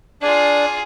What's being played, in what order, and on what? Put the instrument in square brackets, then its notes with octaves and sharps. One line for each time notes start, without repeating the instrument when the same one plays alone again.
[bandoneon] D4 [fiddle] F4 G#4